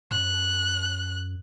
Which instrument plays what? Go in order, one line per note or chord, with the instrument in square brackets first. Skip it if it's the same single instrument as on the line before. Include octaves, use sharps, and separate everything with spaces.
[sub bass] F#2 [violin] F#6